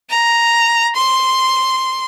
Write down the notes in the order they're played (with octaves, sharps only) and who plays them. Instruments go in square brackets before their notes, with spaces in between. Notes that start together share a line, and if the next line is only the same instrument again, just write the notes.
[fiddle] A#5
C6